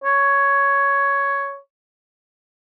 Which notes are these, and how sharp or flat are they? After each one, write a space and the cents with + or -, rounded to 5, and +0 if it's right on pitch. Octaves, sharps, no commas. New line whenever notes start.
C#5 +5